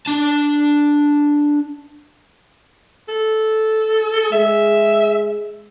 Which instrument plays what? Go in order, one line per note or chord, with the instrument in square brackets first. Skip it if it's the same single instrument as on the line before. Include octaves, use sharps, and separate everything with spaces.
[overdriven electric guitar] D4 A5
[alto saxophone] A4
[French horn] G#3 [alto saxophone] E5